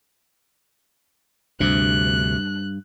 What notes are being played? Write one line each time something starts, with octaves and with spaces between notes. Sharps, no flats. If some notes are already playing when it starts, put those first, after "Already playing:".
D2 G2 C3 F#6